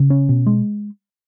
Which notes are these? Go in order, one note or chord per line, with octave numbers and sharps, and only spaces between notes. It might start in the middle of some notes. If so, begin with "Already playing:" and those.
Already playing: C#3
C#4
B2
G#3